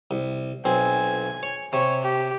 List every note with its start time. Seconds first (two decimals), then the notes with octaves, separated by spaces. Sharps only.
0.11 C2
0.65 B1 C4 G#5
1.43 C#5
1.73 C3 C#5
2.03 G4